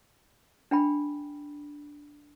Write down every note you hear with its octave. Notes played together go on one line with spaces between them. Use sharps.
D4 G5 B5